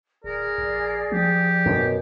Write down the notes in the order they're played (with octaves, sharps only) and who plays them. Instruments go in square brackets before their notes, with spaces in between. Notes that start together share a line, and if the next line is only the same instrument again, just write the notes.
[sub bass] D1 [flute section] G#4 D5 [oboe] A#4
[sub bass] A#1
[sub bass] F3 [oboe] G4
[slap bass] F#2 B2